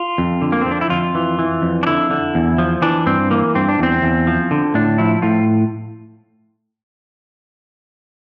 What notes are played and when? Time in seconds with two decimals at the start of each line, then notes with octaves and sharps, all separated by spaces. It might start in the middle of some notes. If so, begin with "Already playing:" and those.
Already playing: F4
0.18 F2
0.42 D3
0.52 A#3
0.62 F3 C4
0.71 D4
0.81 E4
0.90 F2 F4
1.15 E3
1.39 E3
1.62 F2
1.83 D4
1.87 D3 E4
2.11 D3
2.35 E2
2.58 F3
2.82 E3 D4
3.06 G2 C4
3.30 E3 A#3
3.55 G2 C4
3.68 D4
3.79 E2 C4
4.02 E2
4.27 F3
4.51 D3
4.74 A2 D4
4.98 F3 E4
5.22 A2 F4